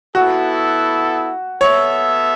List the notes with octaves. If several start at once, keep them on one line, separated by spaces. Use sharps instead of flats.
B3 E4 F#4 A4
B3 A4 C#5 E5